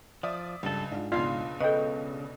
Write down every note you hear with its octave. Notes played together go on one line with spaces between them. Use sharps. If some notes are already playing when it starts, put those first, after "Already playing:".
F3 D5 E5 D#6
C#2 G2 G3 A4
G#2 D4 F4
C#2 B2 D4 F4 F5
C#3 A4 B4 D#5 G5